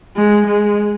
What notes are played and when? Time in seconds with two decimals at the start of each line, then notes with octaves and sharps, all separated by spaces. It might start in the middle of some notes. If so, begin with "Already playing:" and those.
0.17 G#3
0.46 G#3